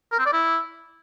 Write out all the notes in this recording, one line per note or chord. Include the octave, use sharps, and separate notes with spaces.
A#4
C4
D5
E4